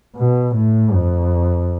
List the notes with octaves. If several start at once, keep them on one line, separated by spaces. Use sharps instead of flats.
B2
A2
F2